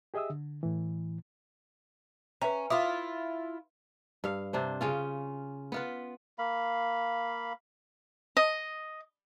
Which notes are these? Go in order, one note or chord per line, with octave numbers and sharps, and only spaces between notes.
G4 G#4 D#5 E5 D#6 E6
D3
A2 E3
C#4 B4 E5 A#5
E4 F4 D6 D#6
G2 F5
C3 D4 C5
C#3 C#4 F4
B3 F4 B4
A#3 F5 B5
D#5